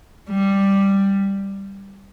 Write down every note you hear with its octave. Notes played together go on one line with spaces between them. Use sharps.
G3